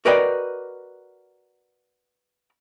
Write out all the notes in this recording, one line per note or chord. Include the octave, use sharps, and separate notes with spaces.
F#4 A#4 B4 D5 D#5 G5